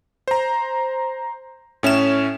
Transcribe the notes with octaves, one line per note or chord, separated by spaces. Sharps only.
C5 A#5
A2 C#4 E5 E7